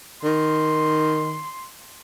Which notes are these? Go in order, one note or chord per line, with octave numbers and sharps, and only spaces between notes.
D#3 C6